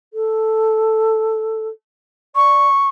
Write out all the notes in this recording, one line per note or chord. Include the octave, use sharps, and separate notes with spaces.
A4
D5 C#6